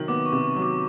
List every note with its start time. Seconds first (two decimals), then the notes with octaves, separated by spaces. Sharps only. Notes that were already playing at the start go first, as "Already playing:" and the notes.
Already playing: C3 D#3 F#3
0.08 B3 D6
0.26 C#6
0.32 C3
0.44 C#6
0.56 F#3
0.62 D6